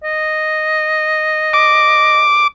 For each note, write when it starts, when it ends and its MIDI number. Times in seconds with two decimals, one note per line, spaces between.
0.04 2.24 75
1.53 2.47 86